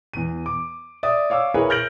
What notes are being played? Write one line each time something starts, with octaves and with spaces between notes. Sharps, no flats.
E2 D#7
D6
D5 E5 D#6
C#5 F5 D6 E6
E4 G#4 A#4 B4 C#5
F6 G6 A#6 D7 F#7